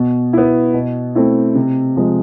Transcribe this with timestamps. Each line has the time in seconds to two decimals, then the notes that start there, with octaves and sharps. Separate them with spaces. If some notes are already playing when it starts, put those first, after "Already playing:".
Already playing: B2
0.33 B3 E4
0.74 B2
1.15 A3 C4 E4
1.55 C3
1.96 F3 G#3